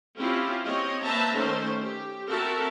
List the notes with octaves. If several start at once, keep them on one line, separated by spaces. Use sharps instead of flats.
C4 C#4 E4 F4 G4
C4 C#5 D#5
A#3 B4 C5 E5 A5 A#5
D#3 A3 C#4 A4 C5
G4
C4 F#4 A4 A#4 E5 A5